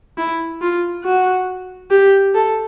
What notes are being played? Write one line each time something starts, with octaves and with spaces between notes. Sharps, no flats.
E4
F4
F#4
G4
A4